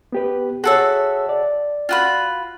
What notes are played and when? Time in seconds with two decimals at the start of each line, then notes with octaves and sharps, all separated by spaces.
0.12 B3 G4 B4
0.64 F#4 G#4 A4 C#5 E5
1.29 D5
1.89 F4 F#4 B5